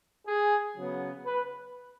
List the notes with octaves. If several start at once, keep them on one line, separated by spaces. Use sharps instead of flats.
G#4
C#3 F#3 B3
B4